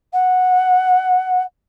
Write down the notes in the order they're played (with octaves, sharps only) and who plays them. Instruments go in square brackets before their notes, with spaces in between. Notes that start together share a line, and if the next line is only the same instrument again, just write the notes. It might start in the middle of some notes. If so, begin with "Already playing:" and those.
[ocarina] F#5